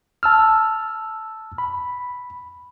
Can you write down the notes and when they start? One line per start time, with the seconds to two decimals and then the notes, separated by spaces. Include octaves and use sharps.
0.23 A5 E6 F6
1.58 B5